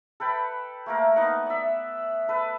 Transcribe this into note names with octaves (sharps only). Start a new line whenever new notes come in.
A4 B4 G5 B5
A3 A#3 A#4
B3 D#4 D#5 F#5
D5 E5
A4 B4